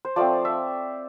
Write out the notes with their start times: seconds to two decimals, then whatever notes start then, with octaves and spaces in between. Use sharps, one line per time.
0.05 C5
0.16 F3 A3 C4 D5
0.45 E5